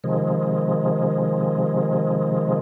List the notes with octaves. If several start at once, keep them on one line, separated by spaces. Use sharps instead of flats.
C3 D#3 F3 G#3